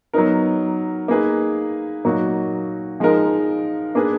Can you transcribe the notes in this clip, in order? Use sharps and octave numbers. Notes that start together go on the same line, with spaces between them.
F#3 B3 D#4 A#4
A#3 D#4 G#4 B4
A#2 F#3 A#3 D#4 F#4
F3 G#3 D#4 A#4
A#3 D4 G#4 B4